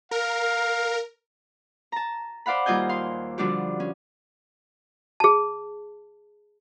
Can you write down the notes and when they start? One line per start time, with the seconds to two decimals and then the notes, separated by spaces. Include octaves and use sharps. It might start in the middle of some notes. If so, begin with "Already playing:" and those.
0.11 A#4 F5
1.92 A5 A#5
2.46 C5 D5 F5 F#5 B5
2.66 D#2 G3 F4 D#5 G#5 G6
2.89 F5 C6
3.38 D3 F3 G3 D4 F#4 G4
3.80 C#4
5.20 G#4 A5